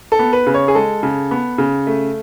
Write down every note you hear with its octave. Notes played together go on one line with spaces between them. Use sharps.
A4
B3
B4
C#3
C#5
G#4
G#3 A4
C#3
B3
C#3
A3